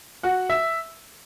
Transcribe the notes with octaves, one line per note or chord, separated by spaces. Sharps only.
F#4 F#5
E5